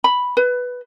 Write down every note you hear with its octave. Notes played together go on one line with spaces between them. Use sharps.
B5
B4